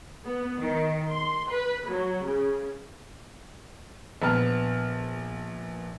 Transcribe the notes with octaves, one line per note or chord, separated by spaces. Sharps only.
B3
D#3
C6
B4
F#3
C#3
A#1 B3 A5 F6